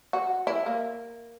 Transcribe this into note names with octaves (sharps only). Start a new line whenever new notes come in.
F#4
E4
A#3